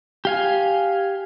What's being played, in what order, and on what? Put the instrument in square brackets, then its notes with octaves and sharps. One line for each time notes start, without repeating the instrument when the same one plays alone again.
[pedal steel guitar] G4 F5 G#5